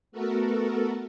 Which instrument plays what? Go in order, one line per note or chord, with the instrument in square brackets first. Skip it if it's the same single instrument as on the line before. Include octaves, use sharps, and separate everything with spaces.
[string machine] A3 B3 F#4 A4 A#4